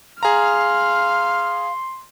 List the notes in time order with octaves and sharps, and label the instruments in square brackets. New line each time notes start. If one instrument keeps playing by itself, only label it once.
[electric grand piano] G#4 A#5 [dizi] F5 [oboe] C6 [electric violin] F6